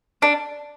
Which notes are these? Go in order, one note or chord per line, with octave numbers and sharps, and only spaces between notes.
D4